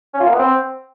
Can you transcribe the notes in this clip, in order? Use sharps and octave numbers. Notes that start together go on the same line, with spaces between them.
C#4
F4
A#3
B3
C4